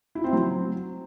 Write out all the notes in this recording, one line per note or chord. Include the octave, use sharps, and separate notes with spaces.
E4
C4
F#3